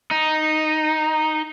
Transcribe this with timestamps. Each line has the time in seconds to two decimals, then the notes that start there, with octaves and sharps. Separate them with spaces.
0.11 D#4